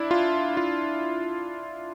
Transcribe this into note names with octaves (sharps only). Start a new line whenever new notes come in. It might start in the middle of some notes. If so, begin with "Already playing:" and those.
Already playing: D4 E4
F4
F4